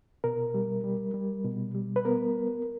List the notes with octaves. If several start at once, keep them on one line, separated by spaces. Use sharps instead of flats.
B2 A#4
G3
G3
G3
B2
G3
B4
B3 A#4